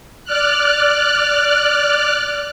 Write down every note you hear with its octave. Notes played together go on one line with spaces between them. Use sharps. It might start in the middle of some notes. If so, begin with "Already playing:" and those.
D5 F6 F#6